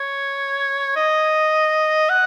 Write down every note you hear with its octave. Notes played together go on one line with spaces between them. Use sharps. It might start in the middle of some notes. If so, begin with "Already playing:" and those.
Already playing: C#5
D#5
F#5